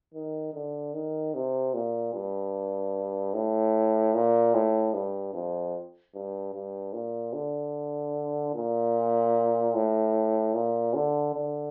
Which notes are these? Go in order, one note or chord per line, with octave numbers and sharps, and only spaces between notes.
D#3
D3
D#3
C3
A#2
G2
A2
A#2
A2
G2
F2
G2
G2
A#2
D3
A#2
A2
A#2
D3
D3